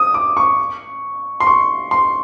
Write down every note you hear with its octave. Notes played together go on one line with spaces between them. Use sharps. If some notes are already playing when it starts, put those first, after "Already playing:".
Already playing: D#6
D6
C#6
C6
C#6
C6